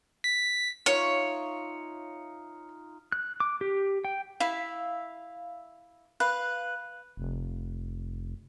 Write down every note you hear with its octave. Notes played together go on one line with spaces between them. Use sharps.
B6
D#4 F4 C#5 E5
F#6
D6
G4
G5
E4 E5 F5
B4 F5 F#6
F1